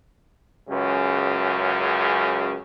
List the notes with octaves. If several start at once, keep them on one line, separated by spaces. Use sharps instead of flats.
C#2 F#2 C#3